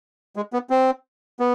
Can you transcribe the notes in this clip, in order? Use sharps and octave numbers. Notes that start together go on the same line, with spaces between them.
G#3
B3
C4
B3